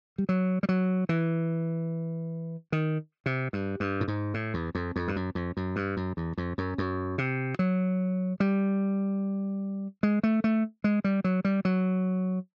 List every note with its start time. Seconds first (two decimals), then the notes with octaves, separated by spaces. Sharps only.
0.18 G3
0.29 F#3
0.63 G3
0.69 F#3
1.09 E3
2.72 D#3
3.26 C3
3.53 G2
3.80 G2
4.01 A2
4.08 G#2
4.34 A2
4.54 E2
4.75 F2
4.96 F2
5.08 G2
5.16 F#2
5.35 F2
5.57 F#2
5.76 G2
5.97 F#2
6.17 E2
6.37 F2
6.58 F#2
6.78 F#2
7.18 C3
7.59 F#3
8.40 G3
10.03 G#3
10.23 A3
10.44 A3
10.84 G#3
11.04 G3
11.24 F#3
11.45 G3
11.65 F#3